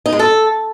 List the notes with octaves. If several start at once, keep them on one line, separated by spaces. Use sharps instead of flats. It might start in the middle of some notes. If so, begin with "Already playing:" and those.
D#4
G#3
A4